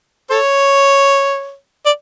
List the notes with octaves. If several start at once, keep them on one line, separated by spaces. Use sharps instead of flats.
A4 C#5
D5